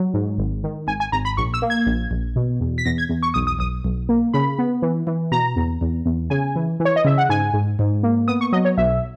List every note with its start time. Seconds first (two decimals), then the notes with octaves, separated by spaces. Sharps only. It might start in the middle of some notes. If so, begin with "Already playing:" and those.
Already playing: F#3
0.14 G#2
0.38 G#1
0.64 D#3
0.87 G#1 G#5
1.00 G#5
1.12 G#1 A#5
1.25 B5
1.37 A#1 C#6
1.54 E6
1.62 A#3
1.70 G#6
1.86 A#1
2.11 A#1
2.36 B2
2.60 E2
2.78 B6
2.85 E2 A#6
2.98 G#6
3.09 E2
3.23 C#6
3.34 B1 D#6
3.47 D#6
3.59 B1 D#6
3.85 B1
4.09 A#3
4.34 C#3 B5
4.59 B3
4.82 E3
5.07 E3
5.32 B2 A#5
5.56 E2
5.81 E2
6.06 E2
6.30 C#3 G#5
6.56 E3
6.80 E3
6.85 C#5
6.96 D#5
7.05 C#3 E5
7.18 F#5
7.29 G#2 G#5
7.54 G#2
7.79 G#2
8.03 A#3
8.28 B3 D#6
8.41 C#6
8.52 F#3 D#5
8.65 C#5
8.78 B1 E5